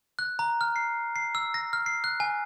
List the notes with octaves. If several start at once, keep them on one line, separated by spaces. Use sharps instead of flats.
F#6
A#5
F6
C7
C7
E6
A#6
F6
C7
F#6
G#5